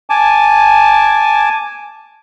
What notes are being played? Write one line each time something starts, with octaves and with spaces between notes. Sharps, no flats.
G#5 A5 D6